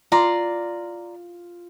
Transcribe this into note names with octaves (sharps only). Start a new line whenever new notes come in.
F4 D5 A#5 C6